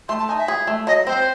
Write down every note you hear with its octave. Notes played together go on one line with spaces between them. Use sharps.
A3 C6
A5
D#4 G#5
E5
G#4
A3
F#3 D#5
C4 C5